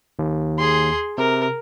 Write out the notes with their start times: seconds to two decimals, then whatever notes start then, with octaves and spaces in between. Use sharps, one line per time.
0.19 D#2
0.58 G#4 C6
1.18 C3 A#4